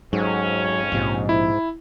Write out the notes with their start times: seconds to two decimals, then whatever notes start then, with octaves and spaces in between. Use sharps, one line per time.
0.13 F2 G#2 F#3 C#4
0.92 A#1 G#2 C3 F3
1.29 E4